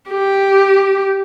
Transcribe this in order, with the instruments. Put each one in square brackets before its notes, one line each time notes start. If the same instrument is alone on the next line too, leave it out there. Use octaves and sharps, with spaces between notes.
[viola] G4